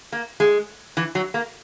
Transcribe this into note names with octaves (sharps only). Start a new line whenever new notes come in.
A#3
G#3
E3
F#3
A#3